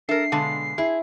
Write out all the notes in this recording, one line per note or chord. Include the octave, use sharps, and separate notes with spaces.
D4 A4 A#4 E5 C7
B2 D3 G#3 F5 A5 C6
E4 G#4